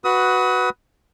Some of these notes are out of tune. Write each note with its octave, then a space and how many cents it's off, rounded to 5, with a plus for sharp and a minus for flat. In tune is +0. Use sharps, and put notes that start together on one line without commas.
F#4 +0 B4 +0 D#6 +35